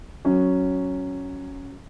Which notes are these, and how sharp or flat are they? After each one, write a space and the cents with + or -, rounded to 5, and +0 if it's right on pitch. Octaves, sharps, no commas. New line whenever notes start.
F#3 +0 C#4 +0